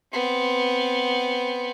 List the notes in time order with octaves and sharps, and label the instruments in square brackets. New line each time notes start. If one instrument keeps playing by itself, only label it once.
[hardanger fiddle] B3 C4